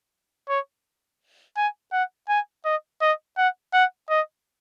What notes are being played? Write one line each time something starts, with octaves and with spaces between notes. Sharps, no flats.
C#5
G#5
F#5
G#5
D#5
D#5
F#5
F#5
D#5